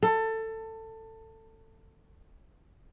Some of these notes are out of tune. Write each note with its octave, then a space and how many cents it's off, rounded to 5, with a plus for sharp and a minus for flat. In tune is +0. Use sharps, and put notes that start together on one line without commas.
A4 +20